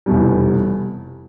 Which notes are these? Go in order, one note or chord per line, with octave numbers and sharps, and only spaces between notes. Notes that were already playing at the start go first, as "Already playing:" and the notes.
F1 E2 B2 G3